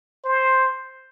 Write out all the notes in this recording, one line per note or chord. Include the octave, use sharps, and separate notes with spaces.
C5